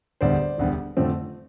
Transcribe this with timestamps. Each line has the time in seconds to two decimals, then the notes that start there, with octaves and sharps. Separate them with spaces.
0.21 E1 D2 D3 G3 B3 C5 D5
0.58 E1 D2 D3 G3 B3
0.97 F2 D3 F3 A3 C4